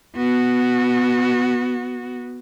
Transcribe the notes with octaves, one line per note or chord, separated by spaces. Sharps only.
B3 F#4